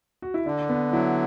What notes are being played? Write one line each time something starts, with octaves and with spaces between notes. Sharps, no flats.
F#4
E4
D3 D4
B3
F#3 E4